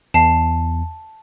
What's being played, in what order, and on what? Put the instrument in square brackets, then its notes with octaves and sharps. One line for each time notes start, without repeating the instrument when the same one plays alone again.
[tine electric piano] E2 [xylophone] A5 C7